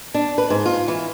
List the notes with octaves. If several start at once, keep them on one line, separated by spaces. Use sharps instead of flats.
D4
B4
G#2
F4
E3